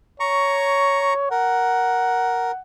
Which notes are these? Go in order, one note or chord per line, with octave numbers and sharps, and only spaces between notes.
C#5 A#5 C#6
A#4 F#5